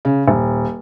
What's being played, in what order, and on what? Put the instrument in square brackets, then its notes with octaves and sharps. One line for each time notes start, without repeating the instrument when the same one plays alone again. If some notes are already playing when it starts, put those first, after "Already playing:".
[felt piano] C#3
D#1